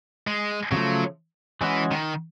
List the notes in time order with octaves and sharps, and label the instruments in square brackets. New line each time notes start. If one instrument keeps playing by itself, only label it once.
[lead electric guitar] G#3
[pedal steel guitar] C#3 F3 A3 [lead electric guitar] F#3
[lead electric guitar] E3 [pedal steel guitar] G#3 C#4 F#4
[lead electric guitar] D#3